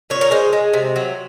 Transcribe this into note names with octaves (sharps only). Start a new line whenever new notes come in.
A#2 C#5
A#4
G#3 C5
G#3
C3
F#3